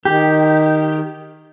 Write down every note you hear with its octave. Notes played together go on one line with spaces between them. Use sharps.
D#3 G4